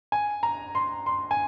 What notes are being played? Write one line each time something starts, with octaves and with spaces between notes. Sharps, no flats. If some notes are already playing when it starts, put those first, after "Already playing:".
G#5
A#5
C6
C6
G#5